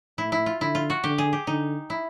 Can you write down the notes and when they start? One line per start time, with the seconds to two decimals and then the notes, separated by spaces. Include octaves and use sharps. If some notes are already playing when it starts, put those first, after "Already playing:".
0.18 A2 E4
0.32 E4
0.46 F4
0.61 D3 E4
0.75 F4
0.90 F#4
1.04 D3 G4
1.18 G#4
1.33 G4
1.47 D3 D#4
1.90 E4